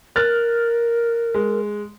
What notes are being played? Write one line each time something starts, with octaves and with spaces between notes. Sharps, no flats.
A#4 F6 F#6 A6
G#3